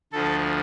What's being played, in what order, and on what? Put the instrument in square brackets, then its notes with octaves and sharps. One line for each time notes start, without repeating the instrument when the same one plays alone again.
[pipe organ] D2 D3 F3 A4